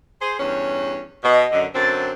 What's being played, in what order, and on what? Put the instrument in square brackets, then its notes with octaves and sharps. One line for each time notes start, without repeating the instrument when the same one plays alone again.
[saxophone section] G#4 C5
E2 G2 C#4
[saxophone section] B2 [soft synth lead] D#5
[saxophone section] F#2 D3
[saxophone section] F#2 D3 C4 [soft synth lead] A6